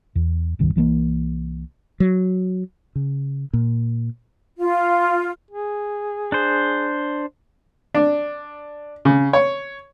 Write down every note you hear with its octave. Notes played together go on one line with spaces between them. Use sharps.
E2
D#1 C2 G2 D#3
C2 E3 G#3 A#3
F#3
C#3
A#2
F4
G#4
D4 C5
D4
C#3
C#5